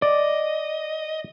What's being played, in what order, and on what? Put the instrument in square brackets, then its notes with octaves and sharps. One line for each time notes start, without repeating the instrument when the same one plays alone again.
[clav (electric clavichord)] D5 [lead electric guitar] D#5